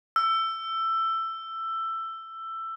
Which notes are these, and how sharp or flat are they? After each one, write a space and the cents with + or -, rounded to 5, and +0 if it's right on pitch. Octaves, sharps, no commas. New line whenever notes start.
E6 +15